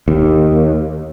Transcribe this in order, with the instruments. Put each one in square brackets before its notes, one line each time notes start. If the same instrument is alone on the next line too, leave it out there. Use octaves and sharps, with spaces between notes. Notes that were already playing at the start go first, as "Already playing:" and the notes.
[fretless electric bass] D#2